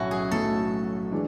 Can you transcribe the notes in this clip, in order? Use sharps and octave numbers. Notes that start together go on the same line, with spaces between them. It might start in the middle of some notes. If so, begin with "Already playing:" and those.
Already playing: B1 A2 F#3 A3 C#4 E4 F#4
G#4
B1 A2 F#3 A3 A4
E3 G#3 D4